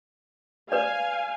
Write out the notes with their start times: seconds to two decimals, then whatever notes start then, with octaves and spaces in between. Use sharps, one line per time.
0.72 B4 D5 F5 G#5